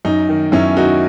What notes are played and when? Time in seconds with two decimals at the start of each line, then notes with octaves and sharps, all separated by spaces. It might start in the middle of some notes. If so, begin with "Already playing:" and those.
0.05 F#2 D#4
0.29 D#3
0.52 F#2 C#4 E4
0.77 D#3 D#4 F#4